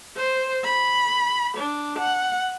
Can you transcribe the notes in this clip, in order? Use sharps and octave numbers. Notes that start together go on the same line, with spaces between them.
C5
B5
D4
F#5